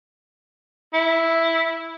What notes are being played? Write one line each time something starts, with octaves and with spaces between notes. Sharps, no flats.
E4